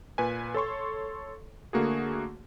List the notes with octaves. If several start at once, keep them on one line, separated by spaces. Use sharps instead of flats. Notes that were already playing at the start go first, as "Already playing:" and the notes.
A#2 B4 G#5
A4 C#5 C6 C#6
D3 A3 A#3 F#4 G#4